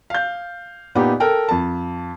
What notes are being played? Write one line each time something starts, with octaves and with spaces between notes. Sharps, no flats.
F5 G6
A#2 B3 D#4 G4
A4 A#4 G5
F2 A5